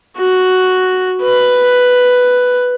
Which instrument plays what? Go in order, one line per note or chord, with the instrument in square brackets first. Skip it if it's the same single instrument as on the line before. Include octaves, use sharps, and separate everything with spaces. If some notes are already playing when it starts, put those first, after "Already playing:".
[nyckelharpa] F#4
B4